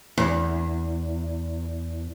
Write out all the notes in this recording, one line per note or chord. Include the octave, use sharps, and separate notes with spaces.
E2